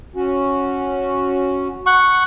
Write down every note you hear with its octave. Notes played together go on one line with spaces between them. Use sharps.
C#4 F#4
F#5 C#6